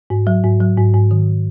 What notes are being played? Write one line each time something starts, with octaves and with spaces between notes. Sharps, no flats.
G#2
F#3
G#2
F#3
G#2
G#2
D#3